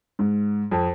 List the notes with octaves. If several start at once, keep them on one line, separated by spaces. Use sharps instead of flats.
G#2
F2